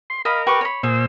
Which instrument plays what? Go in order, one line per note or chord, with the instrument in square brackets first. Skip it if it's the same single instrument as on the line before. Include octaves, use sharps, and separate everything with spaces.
[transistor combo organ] C6
[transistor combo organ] A#4 [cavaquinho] D#5 F5 B5
[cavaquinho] G4 B4 C#6
C#5 B5
[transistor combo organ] A#2 C5 E6 [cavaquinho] G#4